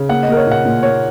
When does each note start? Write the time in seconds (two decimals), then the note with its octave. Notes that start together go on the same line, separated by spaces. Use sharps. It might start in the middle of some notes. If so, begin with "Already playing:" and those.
Already playing: C#3
0.09 A#3 F#5
0.23 D#5
0.28 A#3 A#4
0.37 C#5
0.47 A#2 F#5
0.65 A#2
0.83 A#3 C#5